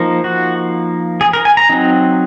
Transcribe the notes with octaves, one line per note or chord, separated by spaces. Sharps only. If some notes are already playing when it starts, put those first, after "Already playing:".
Already playing: F3 A#3 D#4
F#4
G#4
A#4
G#5
A#5
F#3 C4 D#4